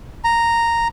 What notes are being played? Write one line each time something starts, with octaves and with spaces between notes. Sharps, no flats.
A#5